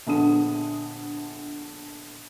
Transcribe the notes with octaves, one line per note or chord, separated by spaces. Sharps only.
A#1 D3 B3 D4 D#6 D#7